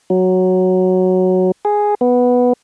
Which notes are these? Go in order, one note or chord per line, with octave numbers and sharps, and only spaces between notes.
F#3
G#4
B3